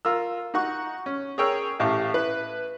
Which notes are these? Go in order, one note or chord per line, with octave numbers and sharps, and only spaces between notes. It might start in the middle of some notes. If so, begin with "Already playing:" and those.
F4 A#4 E6
D#4 F#4 F#5 C#6
C#4
G#4 A#4 C#5 G5 E6
A1 A2 G4 F5 A5
E4 B4